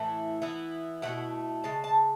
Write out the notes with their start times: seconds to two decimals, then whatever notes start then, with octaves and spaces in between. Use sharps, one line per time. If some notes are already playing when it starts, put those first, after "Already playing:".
Already playing: A2 E3 A3 E4
0.42 E3 B3 E4
1.02 B2 A3 E4 F#5
1.64 C#3 G#3 A5
1.84 A5